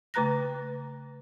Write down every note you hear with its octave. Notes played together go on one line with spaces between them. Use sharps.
C#3 A3 B4 A#5 F#6 A#6